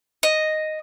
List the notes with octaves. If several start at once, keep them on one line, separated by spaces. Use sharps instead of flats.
D#5